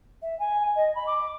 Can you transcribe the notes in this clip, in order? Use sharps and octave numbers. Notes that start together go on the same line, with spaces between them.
E5
G#5
D#5
B5
D6